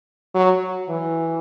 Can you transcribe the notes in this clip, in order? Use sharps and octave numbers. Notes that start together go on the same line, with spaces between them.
F#3
E3